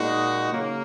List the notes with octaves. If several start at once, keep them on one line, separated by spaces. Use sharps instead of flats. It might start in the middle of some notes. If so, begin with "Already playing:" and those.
Already playing: A#2 G#3 D#4 F#4
C#3 F#3 A#3